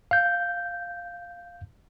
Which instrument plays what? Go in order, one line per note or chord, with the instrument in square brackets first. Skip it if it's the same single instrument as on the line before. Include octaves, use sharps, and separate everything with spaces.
[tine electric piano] F5 G6